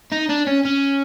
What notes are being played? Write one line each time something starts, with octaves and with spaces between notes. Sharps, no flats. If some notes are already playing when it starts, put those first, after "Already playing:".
D#4
D4
C#4
C#4